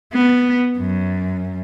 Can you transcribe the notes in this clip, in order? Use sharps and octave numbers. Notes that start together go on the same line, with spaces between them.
B3
F#2